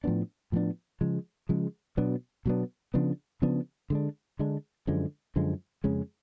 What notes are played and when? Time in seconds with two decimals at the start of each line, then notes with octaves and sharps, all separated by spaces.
0.04 A2 F3 B3 D4
0.52 A2 F3 B3 D4
1.01 C#3 F3 G#3
1.49 C#3 F3 G#3
1.97 B2 F#3 B3 D4
2.46 B2 F#3 B3 D4
2.94 C#3 F3 B3 D4
3.42 C#3 F3 B3 D4
3.90 D3 G#3 D4
4.39 D3 G#3 D4
4.87 F#2 D3 F3 G#3
5.36 F#2 D3 F3 G#3
5.84 F2 C#3 G#3 C#4